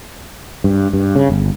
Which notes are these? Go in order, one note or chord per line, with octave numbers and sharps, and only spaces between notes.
G2
G2
C#3
G1